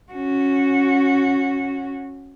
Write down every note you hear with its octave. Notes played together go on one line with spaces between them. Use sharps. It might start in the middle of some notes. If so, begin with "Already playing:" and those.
C#4 F#4